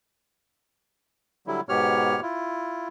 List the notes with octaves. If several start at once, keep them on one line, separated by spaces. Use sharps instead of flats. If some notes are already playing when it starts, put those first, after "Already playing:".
D3 F#3 G3 E4
G#2 B2 B3 G4 C#5 F6
E4 F4